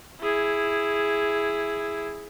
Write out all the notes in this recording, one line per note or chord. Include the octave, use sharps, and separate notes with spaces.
E4 G#4